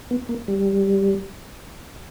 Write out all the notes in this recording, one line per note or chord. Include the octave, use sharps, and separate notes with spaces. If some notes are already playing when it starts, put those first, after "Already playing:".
B3
A#3
G3